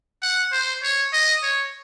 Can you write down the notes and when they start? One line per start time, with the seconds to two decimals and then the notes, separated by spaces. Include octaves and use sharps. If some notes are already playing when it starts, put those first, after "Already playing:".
0.22 F#5
0.52 C5
0.83 C#5
1.13 D#5
1.43 C#5